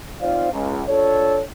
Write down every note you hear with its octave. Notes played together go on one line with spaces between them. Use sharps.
C4 D#4 F4 C5 D5 F5
C#2
D4 F4 A4 C#5